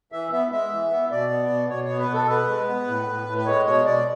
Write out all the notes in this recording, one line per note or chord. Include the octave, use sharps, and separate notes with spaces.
E3 E5
B3 E5
G#3 E5
E3
B3
B2 D5
B3
B2
B2 C#5
C#5
B3
B4
B2
A4
B3 B4
G#3
B3
A2
A2
A2
B4
G#3 C#5
B2 C#5
B2 D5